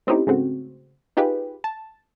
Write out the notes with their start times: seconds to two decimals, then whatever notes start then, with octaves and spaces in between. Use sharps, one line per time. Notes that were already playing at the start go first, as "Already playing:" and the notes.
0.07 A3 C4 C#4 D#4 E4 G4
0.27 G#2 C#3 A3 C4 F#4
1.17 D#4 F4 G4 G#4 B4
1.64 A5